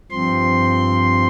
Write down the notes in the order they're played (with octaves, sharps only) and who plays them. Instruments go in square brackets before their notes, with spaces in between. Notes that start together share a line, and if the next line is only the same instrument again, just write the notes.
[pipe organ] G2 F3 C4 C6